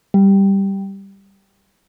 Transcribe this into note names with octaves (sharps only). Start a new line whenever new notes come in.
G3